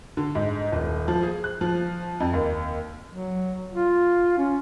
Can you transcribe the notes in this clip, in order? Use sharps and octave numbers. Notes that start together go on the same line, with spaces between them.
D3
G#2
D#1
F3
G#4
F#6
F3
F2
D#2
F#3
F4
C#4